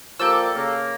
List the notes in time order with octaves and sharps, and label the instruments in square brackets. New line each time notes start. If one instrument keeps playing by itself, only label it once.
[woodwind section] F3 A#3 D5 [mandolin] G4 A4 E6
[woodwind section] C#3 A#3